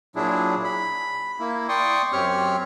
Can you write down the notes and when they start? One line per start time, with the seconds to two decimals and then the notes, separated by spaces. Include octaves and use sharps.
0.16 A#2 F#3 D4 E4 G#4
0.64 B5
1.40 A#3 E4
1.69 D5 G5 C6 C#6 D#6
2.13 F#2 C4 G4 C#5 C#6 F6